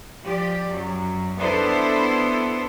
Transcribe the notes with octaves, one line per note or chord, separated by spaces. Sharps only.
F3 G4 D5
F#2 F#3
B3 D4 E4 A4 C5